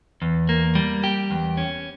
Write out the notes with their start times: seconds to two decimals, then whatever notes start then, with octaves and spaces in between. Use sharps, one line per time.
0.22 E2
0.49 A#3
0.75 G3
1.04 G4
1.31 E2
1.57 C#4